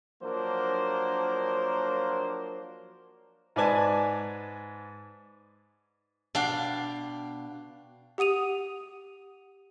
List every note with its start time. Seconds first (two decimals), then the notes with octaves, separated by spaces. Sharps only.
0.22 F3 F#3 A#3 D4 A#4 C5
3.56 G#2 B4 D5 G#5 A5
6.35 B2 D4 F5 G5
8.18 G4 F#5 D#6 D#7 F7